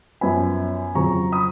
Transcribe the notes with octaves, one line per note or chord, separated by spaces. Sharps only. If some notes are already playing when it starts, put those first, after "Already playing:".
F#2 F3 B3 G#5 B5
F2 C#3 F#3 A#5 C#6
B5 D#6